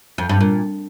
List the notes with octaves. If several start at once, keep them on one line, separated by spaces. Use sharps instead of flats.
F2
G2
A#2